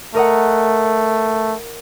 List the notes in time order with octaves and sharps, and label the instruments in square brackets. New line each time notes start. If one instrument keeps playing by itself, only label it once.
[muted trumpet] A3 [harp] A#4 D#5 F#5